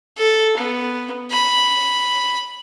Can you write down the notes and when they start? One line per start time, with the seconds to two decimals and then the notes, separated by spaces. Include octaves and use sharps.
0.17 A4
0.57 B3
1.31 B5